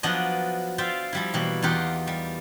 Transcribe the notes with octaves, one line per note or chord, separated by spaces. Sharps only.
F3 F#3 B3 D4 D5 D#5
F4 C5 D5 E5 F5 G5
F3 G3 E4
B2 E3 G3 A#3
E2 A#3 D#4 F4 G4 F#5
G3